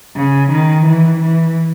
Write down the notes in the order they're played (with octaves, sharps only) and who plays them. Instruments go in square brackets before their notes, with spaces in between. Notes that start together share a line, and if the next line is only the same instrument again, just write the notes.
[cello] C#3
D#3
E3
E3